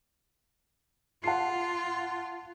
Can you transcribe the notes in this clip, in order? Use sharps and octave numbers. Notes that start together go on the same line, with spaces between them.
F4 F#5 A5 C7